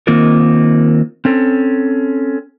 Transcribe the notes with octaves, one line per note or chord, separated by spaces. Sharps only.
D#3 A#3 C4 D#4 F4 A#4
C4 C#4 A4